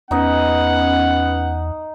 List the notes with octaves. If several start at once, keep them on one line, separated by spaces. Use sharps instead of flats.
E2 B3 C#4 D#4 D#5 F#5